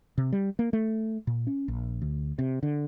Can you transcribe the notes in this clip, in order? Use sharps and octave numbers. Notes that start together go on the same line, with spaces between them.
C3
G3
A#3
A3
A#2
C#4
A#1
D2
C3
D3